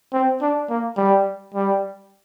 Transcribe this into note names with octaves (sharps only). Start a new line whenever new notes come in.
C4
D4
A#3
G3
G3